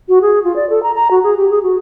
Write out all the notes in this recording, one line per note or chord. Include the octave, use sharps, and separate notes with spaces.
F#4
G#4
F4
D5
A4
A#5
A#5
F#4
G#4
G4
G#4
F#4